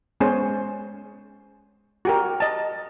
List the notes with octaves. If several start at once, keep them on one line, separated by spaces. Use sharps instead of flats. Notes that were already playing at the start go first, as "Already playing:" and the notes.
G#3 B3 C#4 G#4 C5
F#4 G4 A#4
D#5 A5